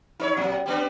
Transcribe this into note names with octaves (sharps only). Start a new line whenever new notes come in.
D#4 C5 C#5
A#2 F#3
G3 B3 D4